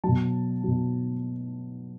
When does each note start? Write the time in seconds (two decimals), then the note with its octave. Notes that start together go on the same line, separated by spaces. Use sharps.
0.04 B2 F#3 A5
0.64 B2 F#3